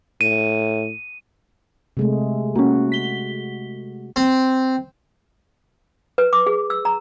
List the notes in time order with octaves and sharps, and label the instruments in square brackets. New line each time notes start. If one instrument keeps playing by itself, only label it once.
[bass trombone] A2 [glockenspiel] D#7
[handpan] C3 G#3 A3
[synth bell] A#3 C#4 [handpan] F#4
[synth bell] B6 G7
[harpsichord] C4
[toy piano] B4
D6
G#4
E6
A#5